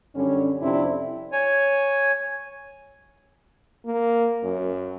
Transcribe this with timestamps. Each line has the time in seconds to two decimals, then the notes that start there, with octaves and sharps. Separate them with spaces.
0.15 F#2 D3 G3 C#4
0.61 F2 C3 C4 D4 E4 D5
1.32 C#5 G#5
3.86 A#3
4.44 F#2